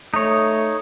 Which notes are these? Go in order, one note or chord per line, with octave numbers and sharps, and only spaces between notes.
A3 D#4 C#5